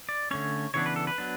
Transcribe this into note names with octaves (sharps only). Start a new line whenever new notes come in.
D5
D3 A3 C#4 C#5
C#3 E3 B3 D4 C#5
B4
A4
B4
F#3 B3 D4